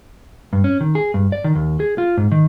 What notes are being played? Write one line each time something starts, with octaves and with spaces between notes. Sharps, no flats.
G2
C#4
D#3
G#4
G2
D5
D#3
D#2
G#4
F4
G#2
D#3